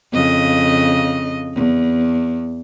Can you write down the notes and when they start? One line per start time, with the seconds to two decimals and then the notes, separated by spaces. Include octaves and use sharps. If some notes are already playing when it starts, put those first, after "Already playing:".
0.13 F2 C#3 D#5
1.55 E2